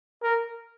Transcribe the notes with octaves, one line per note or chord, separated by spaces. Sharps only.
A#4